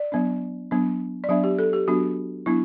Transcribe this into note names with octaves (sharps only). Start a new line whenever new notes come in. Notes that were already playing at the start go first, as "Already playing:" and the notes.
Already playing: D5
F#3 B3 D4
F#3 B3 D4
D5
F#3 B3 D4 E5
G4
A4
G4
F#3 B3 D4 F#4
F#3 B3 D4 E4